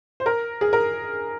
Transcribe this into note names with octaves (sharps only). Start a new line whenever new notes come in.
C5
A#4
G#4
A#4